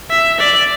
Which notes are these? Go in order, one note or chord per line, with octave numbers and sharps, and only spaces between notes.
E5
D5